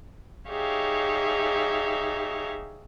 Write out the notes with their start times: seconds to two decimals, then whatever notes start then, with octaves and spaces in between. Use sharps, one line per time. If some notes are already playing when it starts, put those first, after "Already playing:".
0.49 D#4 G4 G#4 C#5 E5 F5